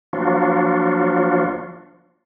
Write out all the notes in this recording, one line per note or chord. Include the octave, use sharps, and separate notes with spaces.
F3 F#3 A#3 D4 F4 F#4